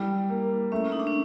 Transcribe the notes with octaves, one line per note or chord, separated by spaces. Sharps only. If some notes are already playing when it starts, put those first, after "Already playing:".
Already playing: G3 E4
A#3
A3 C#4
D#4
D4
C#4